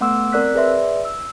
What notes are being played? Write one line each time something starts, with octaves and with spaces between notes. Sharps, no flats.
A3 B3 F#5 C6 D6 E6
C4 A#4 D5 F#6 B6
G#4 B4 D5 E5 C6
E6